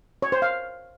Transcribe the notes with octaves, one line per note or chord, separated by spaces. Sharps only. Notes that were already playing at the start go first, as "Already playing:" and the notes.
C#5
C5
F5